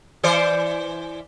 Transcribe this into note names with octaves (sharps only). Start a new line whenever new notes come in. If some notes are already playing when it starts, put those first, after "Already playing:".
E3 C5 D5